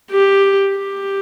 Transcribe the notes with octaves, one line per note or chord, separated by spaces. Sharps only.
G4
G4